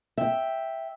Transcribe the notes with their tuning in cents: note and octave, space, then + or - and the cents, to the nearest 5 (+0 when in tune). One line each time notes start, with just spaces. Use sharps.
E5 +0 G5 +0